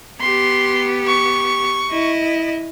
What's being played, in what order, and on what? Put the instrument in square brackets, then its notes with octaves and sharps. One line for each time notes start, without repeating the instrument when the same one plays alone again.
[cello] B3 G4 [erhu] C6
[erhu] C#6
[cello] E4 D#5